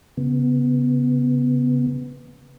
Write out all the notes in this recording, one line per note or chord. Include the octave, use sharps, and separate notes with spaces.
C#3 B3